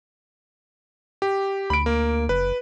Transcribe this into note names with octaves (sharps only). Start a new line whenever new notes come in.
G4
D2 B5 D7
A#3
F#1 B4